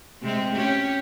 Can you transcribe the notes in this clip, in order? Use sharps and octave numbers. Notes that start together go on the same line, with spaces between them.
C3 G#3 C4
C#4 G4